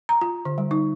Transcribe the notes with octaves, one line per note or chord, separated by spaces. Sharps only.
A#5
F4
D3
G3
D#4